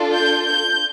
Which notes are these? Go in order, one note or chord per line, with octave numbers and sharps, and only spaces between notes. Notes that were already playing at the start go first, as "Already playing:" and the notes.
Already playing: D4 F4 A4
G6
G6